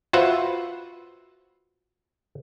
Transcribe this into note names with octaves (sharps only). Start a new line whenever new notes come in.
F4 F#4 B4 C5 E5 F#5